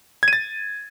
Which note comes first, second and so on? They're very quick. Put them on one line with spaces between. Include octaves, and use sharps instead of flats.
G#6 D#7 A6